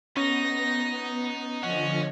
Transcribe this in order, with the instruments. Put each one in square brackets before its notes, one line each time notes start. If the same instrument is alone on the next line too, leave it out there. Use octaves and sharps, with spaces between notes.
[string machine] B3 [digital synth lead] C#4 [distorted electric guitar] D#4 [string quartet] A#6
[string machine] D3 F3 [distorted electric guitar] C#4 [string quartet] D#5 [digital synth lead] F#5